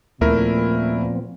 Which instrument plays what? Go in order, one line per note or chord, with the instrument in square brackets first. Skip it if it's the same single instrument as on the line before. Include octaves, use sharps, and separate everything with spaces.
[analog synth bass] D#2 [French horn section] A#2 [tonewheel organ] F3 B3 C4 [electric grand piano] A3 E4 A#4